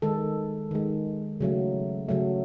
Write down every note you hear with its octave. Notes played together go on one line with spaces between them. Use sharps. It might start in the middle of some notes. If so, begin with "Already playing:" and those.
D#3 G#3 A4
D#3 G#3
C#3 F#3 A3
C#3 F#3 A3